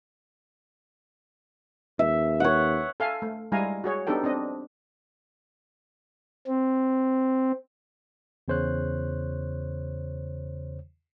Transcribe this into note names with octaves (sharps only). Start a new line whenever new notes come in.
D#2 E5
C#5 F#5
A4 E5 F5 G#5
A3
G3 G#3 E4 F5 G#5 A#5
F#4 G#4 C#5
B3 D4 D#4 G4 A4 G5
C4 D4 D#5
C4
E2 C#3 C5 C#5 F#6